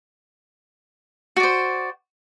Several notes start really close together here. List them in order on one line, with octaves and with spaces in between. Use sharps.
F#4 D5 C5